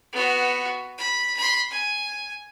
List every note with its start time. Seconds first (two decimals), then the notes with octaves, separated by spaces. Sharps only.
0.12 B3 F#4
0.98 B5
1.37 B5 C6
1.71 G#5